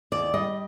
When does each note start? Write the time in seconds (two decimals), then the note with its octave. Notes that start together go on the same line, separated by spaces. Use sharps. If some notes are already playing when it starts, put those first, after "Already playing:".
0.12 D#2 D5
0.34 G3 D#5